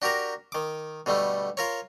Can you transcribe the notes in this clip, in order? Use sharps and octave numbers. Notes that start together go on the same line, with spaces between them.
D4 F#4 G4 A#4 A#5
D#3 D6
B2 D3 G3 A3
F4 A#4 C#5